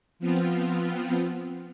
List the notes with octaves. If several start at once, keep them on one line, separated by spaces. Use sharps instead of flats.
F3 B3 C4 F4